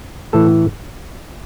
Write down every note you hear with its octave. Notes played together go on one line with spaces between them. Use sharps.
A2 E3 A4